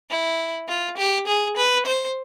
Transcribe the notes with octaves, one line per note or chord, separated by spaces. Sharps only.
E4
F4
G4
G#4
B4
C5